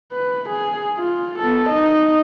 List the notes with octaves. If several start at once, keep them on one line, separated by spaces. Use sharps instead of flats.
B4
G#4
F4
B3 A4
D#4 D#5